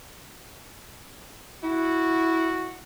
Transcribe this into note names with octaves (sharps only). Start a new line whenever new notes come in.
E4 F#4